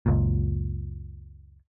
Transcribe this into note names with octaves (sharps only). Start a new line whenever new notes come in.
F#1 C#2 A#2